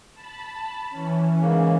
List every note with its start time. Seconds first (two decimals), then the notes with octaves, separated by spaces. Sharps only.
0.13 A5 B5
0.89 E3 C#4
1.41 G#2 C#3 A#3